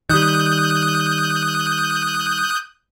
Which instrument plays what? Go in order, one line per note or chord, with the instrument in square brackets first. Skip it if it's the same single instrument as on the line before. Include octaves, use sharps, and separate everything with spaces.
[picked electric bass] D#3 G3 [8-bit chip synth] D#6 F#6 G6